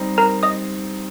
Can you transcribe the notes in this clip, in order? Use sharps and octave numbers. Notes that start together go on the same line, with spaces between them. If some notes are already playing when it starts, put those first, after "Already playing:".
Already playing: G3 C4 D#4
A#4 A#5
D#5 D#6